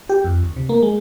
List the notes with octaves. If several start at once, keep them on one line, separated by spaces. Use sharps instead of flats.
G4
F2
D2
C3
A#3
G#3